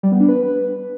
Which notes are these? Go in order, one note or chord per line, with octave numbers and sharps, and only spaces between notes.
G3
B3
D4
B4